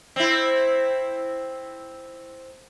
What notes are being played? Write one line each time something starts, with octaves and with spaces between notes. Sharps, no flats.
C4 E4